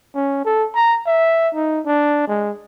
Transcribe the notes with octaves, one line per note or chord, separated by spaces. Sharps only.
C#4
A4
A#5
E5
D#4
D4
G#3